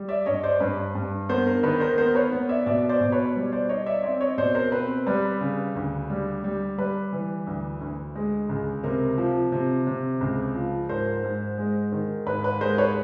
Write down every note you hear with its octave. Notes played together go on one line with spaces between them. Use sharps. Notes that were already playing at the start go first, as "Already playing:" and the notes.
Already playing: G3
D5 E5
G2 C#5 D#5
C5 D5
G2 B4
G2
B3 A#4 C5
A#4
D#3 B4
A#4 C5
B3 A#4 C5
B4 C#5
B3
D5 E5
B2 D5 E5
C5 D5
B2
B4 C#5
G3
C5 D5
D#4 C#5 D#5
D5 E5
C4 D5 E5
C#5 D#5
B2 C5 D5
A#4 C5
C4 B4
G3 B4
C#3
D2
G3
G3
G3 B4
E3
D2
D2
G#3
C#2
C3 A#4
F3
C3
C3
C#2
F3
G#2 A#4 C5
G#2
G#3
D#3
G#2 B4
B4
G#3 A#4 C5
B4 C#5